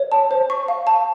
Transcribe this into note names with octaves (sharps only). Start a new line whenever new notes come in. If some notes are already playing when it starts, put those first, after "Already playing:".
Already playing: C#5
A5
C5
C#6
F5
A5